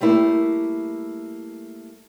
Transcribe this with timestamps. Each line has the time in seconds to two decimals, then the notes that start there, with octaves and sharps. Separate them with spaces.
0.01 G3 A3 A#3 E4